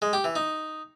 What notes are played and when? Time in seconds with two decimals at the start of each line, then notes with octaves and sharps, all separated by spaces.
0.02 G#3
0.13 G4
0.24 E3
0.36 D#4